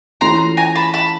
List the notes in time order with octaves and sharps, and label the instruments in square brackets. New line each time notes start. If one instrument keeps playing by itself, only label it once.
[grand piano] E3 A3 C#4 F4 [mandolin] A#5 C6
[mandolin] G#5 A#5
A5 B5
A5 B5